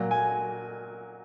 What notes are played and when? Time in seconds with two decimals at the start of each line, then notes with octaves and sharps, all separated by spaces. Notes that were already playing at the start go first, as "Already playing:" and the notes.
Already playing: A#2 F#3 A#3
0.11 G#5